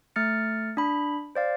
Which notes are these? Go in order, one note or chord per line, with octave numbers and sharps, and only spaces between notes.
A3 F6 A6 C#7
D4 B5
C5 D5 F5